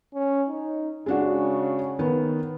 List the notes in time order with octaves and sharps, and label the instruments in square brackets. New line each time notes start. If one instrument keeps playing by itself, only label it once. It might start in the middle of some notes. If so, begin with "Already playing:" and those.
[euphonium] C#4
D#4
[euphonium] C#3 [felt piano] G#3 D4 F#4
[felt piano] D#3 B3